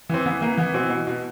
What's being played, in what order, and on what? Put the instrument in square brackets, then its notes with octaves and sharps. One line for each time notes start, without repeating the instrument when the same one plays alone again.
[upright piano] E3 C4
E3 B3
E3 A#3
E3 B3
B2 C4
B2
B2